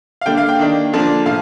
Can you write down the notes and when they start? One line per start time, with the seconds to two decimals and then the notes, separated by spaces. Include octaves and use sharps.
0.21 F5
0.26 D3 G3 A#3 D4 G5
0.37 F5
0.49 G5
0.59 D#3 A#3 D4
0.93 D3 F3 A#3 D4
1.26 A2 F3 F5